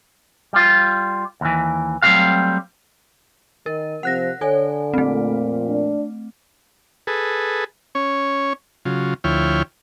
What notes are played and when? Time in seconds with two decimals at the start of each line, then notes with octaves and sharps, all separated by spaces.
0.53 G3 F4
1.41 D#2 E3
2.02 F#3 G3 A3 C4 F#4 F5
3.66 D#3 A#4
4.03 C3 F3 F#5 F#6 A#6
4.41 D3 A4 C#5 G#5
4.94 F2 A#2 A3 C4
5.68 D4
7.07 G#4 A4 B4
7.95 C#4 C#5
8.85 C#3 F#3 F4
9.24 D2 F3 E4 C#5 G5 F6